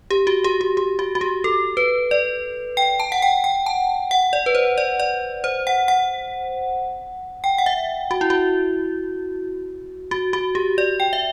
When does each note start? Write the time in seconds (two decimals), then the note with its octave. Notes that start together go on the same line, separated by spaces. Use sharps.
0.11 G4
0.27 F#4
0.44 G4
0.61 G4
0.77 G4
0.99 F#4
1.15 F#4
1.21 G4
1.44 A4
1.77 B4
2.11 D5
2.77 G5
3.00 A5
3.12 F#5
3.22 G5
3.44 G5
3.66 A5
4.11 F#5
4.33 D5
4.46 B4
4.55 C5
4.78 D5
5.00 D5
5.44 C5
5.67 F#5
5.88 F#5
7.44 G5
7.58 F#5
7.66 E5
8.11 F#4
8.21 E4
8.30 F#4
10.11 F#4
10.33 F#4
10.55 G4
10.78 D5
11.00 G5
11.13 E5